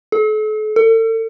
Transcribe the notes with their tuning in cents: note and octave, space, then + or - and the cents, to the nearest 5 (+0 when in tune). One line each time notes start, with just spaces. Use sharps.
A4 -40
A4 +40